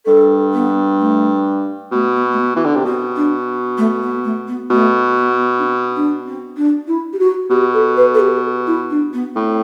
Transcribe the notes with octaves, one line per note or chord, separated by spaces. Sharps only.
G2 A4
B3
A3
B2 A3
B3
A3
B3
E3
D3
C3
B2 C4
D4
A3
B3
A3
B3
B2 A3
B3
D4
C4
D4
C4
D4
E4
G4
F#4
B2 G4
A4
B4
A4
G4
E4
D4
B3
A2 C4